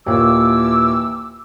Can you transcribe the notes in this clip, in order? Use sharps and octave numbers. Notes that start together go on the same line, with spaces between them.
D#2 A#2 E3 D6 E6